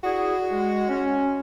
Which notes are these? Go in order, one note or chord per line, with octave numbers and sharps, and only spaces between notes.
D4 E4 F#4 G#4
G#3
C#4